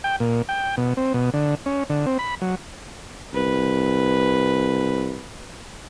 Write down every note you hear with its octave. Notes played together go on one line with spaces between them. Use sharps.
G5
A#2
G5
B2
C4
B2
D3
C#4
D3
C4
B5
F#3
C2 B4